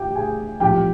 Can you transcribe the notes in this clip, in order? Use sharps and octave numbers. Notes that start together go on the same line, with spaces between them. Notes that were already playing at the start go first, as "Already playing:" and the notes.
Already playing: G4 G5
G#4 G#5
C2 A#2 F3 C4 G4 G5